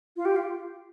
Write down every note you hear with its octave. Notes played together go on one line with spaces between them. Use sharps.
F4
G4
F4